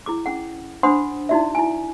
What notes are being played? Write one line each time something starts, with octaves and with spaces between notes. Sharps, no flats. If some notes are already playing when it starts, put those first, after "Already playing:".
E4 G#4 D6
C#4 G#4 F#5
D4 C5 F#5 B5 C6 D#6
D#4 E4 F#4 D5 E5
E4 G#5